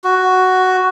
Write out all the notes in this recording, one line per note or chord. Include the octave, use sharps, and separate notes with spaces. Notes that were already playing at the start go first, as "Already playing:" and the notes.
F#4